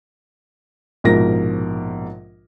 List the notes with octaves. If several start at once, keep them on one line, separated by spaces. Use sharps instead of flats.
A#1 G#2 B2 F3 A#4 A#6